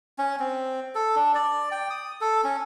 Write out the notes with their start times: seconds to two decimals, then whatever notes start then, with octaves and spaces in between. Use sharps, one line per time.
0.19 C#4
0.39 C4
0.95 A4
1.16 D4
1.35 D5
1.71 G5
1.90 D#6
2.21 A4
2.44 C#4